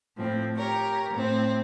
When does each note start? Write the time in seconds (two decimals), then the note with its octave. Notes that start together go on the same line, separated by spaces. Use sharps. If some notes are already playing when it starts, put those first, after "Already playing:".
0.17 A2 F3 C4
0.56 G4 A#4 C#5
1.14 A2 C4